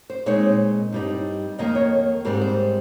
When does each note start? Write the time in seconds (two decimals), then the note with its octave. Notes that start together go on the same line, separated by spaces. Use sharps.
0.10 C5
0.26 A#2 G#3 C4 D#4 C#5
0.92 G2 G3 C4 D#4
1.58 F2 D#3 A#3 D#5
1.75 C#5
2.25 G#2 G3 C4 D#4 A#4
2.42 C5